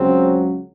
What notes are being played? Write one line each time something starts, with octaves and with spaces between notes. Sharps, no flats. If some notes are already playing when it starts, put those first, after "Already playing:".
Already playing: C#2 C#3 F#3 C4